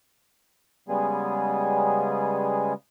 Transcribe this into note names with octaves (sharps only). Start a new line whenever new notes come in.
C#3 G3 G#3 B3 G#4